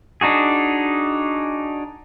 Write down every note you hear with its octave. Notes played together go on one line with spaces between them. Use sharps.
D4 D#4 F#4 G#4